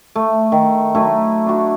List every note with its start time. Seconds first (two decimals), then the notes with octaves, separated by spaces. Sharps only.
0.15 A3
0.52 D#3
0.95 F#3 A3 D#4 E4
1.46 D4 F#4